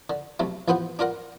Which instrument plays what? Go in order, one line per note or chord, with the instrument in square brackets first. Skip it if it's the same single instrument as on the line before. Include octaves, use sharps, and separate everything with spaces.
[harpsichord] D3
B1 C3 A3
A1 F3 B3 C5 F#5
D4 F4 A#4 F#5